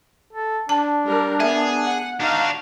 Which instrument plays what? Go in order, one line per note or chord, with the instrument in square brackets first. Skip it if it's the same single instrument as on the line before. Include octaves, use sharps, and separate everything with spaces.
[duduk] A4
[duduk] D4 [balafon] A5
[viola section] G3 A#4
[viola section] B3 [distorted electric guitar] G#4 [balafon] E5
[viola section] F#5
[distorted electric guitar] D4 F#4 [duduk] D#4 [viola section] F5